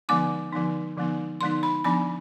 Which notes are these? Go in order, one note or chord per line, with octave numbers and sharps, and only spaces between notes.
D3 F3 G#3 B3 D#4 D6
D3 F3 G#3 B3 D#4
D3 F3 G#3 B3 D#4
D3 F3 G#3 B3 D#4 C6
B5
F3 B3 D4 B5